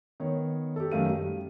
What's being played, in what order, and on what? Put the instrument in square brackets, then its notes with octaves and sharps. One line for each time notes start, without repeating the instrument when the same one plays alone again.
[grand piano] D#3 B3 C#5
G4 A4
F#2 D#3 A3 F5 D#7
G3